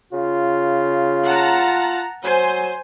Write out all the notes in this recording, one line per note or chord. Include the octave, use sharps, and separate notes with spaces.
C#3 F4
F#5 A5 A#5
F#3 C5 G#5